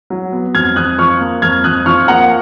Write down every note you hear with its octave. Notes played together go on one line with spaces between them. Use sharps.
F#3
B3
F2 F6 G#6
F2 D#6 F#6
F3 C#6 F6
A#3
F2 F6 G#6
F2 D#6 F#6
F3 C#6 F6
A#3 F#5 A#5